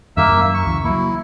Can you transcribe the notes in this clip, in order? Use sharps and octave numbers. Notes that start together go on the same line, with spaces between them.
F#2 D#3 G#3 A#3 E5 E6
F#2
C#6
C#2 E3
F#3 A#3 E4